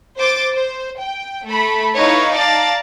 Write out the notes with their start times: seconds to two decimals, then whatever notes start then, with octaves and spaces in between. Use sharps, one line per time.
0.19 C5 D6 A6
0.53 C5
1.01 G5
1.47 A3 B5
1.96 D#4 E4 B4 C#5 F5 C#6
2.34 D5 F5 A5 A#5 A6